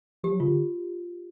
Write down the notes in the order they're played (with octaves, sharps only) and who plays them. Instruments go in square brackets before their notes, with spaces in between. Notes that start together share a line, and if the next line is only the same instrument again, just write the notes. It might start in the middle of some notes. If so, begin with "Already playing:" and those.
[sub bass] F3 [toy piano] G4
[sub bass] F#3
[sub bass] C#3 [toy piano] F4
[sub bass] D3